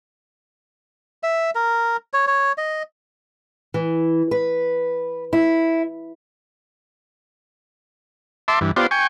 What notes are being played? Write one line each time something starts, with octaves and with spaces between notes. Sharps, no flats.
E5
A#4
C#5
C#5
D#5
E3
B4
E4
E5 A5 C6 D6
G2 E3
B3 F4 G4 C5 D5
G5 G#5 C#6